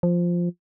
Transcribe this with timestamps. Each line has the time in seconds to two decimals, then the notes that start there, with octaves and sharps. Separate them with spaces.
0.03 F3